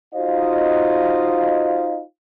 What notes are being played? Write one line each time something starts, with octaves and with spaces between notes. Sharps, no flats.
D#4 F4 F#4 C5 D#5 F5